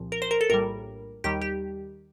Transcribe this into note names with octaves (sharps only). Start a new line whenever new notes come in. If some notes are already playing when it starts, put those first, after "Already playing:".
Already playing: C2 A#2 F3
A#4
C5
A#4
A4
A#1 A2 G3 A#4
D#2 D#3 G3 G4
G4